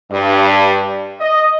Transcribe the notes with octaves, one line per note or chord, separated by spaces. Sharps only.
G2
D#5